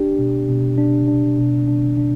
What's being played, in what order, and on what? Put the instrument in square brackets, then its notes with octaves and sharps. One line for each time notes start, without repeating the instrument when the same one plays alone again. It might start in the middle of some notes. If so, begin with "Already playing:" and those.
Already playing: [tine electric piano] D4 G4
B2
B2
D4
D4
B2
D4
D4